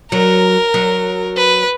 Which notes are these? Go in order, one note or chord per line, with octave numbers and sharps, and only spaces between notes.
F#3 A#4
F#3
B4